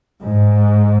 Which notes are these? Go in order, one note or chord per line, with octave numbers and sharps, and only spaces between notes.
G#2